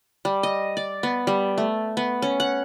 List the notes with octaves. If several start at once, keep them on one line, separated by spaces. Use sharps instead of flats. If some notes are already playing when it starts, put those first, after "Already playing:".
G3
D#5
D5
B3
G3
A3
B3
C#4
F#5